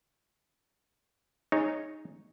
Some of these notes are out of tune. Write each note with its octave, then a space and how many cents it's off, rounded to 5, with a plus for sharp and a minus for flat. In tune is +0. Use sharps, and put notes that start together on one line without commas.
D#4 +0 G#4 -15 C#5 +0